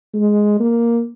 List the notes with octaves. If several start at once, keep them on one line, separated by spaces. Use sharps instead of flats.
G#3
A#3